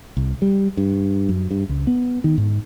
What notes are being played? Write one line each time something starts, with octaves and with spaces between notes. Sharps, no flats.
C2
G3
G2
F#2
G2
C#2
B3
D#3
G#2